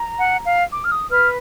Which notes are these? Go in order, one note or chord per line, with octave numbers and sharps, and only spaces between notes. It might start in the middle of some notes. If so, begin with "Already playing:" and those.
Already playing: A#5
F#5
F5
D6
F6
D#6
B4 F6